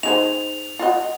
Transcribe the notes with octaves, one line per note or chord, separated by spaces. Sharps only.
D#4 G#4 C5 F7
F4 F#4 D#5